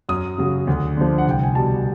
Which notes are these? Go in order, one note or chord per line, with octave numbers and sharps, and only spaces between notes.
F#2 D#6
C#3 F#3
D2
D3 F3
F#5
C2 G5
G#5
B2 G3 A5